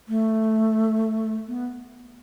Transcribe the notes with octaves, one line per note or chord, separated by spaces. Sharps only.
A3
B3